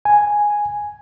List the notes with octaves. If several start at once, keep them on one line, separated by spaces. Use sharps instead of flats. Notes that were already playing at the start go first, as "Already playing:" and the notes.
G#5